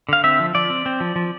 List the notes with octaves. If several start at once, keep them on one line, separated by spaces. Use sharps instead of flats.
D3 F5
C4 E5
F3
F3 D5
C4
C4
F3
F3